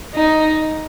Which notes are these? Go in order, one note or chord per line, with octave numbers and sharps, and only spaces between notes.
D#4